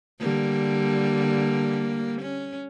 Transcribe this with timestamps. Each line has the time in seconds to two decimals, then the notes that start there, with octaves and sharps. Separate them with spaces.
0.19 D3 G3 A#3
2.22 C#4